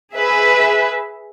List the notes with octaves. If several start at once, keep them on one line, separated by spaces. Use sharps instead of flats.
G#4 B4 E5